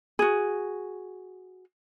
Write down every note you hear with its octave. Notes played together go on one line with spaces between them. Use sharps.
F#4 G#4